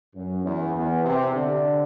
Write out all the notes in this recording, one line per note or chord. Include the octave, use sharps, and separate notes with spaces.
F#2
E2
E2
C3
D3